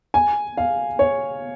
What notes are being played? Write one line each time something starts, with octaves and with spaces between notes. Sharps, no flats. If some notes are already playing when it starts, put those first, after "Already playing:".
G#5
F5
C#5